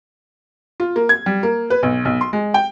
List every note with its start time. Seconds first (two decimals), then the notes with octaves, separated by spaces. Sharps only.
0.80 F4
0.96 A#3
1.09 G#6
1.26 G3
1.43 A#3
1.70 B4
1.83 B1
2.05 B1
2.21 C6
2.33 G#3
2.54 G5